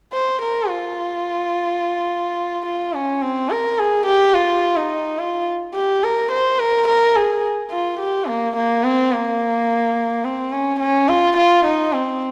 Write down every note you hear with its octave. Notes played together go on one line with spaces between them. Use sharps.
C5
A#4
F4
F4
C#4
C4
A#4
G#4
G4
F4
D#4
F4
G4
A#4
C5
A#4
A#4
G#4
F4
G4
A#3
A#3
C4
A#3
C4
C#4
C#4
F4
F4
D#4
C4